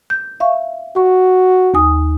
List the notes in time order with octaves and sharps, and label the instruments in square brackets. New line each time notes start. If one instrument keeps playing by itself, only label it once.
[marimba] G6
E5 F5 C#6
[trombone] F#4 [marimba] C#6
[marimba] D#2 G#5 D#6